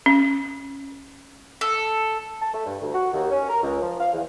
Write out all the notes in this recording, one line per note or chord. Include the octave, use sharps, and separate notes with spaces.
C#4
A4
A5
A3
G2
D2
F#4
D#2
C#4
A#4
C#2
F3
F5
E2